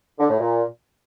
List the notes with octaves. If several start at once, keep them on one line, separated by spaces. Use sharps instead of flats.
D3
A2
A#2